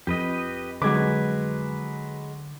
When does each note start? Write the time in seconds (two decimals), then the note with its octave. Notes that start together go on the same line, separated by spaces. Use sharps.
0.07 F2 G4 B4 D#5
0.82 D3 F#3 G#3 B4 G#5 D6